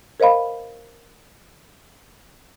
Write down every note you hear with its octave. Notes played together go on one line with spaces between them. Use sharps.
A#4 C5 D#5 F5 B5